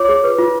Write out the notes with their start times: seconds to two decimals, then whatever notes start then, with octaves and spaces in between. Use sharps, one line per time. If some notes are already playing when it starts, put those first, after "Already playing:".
Already playing: F4 C#5 D6
0.09 G#4
0.24 B4
0.39 F4